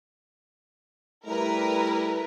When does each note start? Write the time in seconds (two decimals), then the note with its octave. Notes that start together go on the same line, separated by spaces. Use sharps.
1.26 G3 A3 E4 A#4 B4